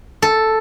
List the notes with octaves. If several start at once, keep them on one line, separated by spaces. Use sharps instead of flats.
A4